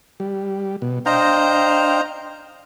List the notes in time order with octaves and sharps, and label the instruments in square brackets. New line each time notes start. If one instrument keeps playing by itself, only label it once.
[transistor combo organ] G3
B2
[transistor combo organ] D4 F5 G5 [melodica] C5 D#5 A#5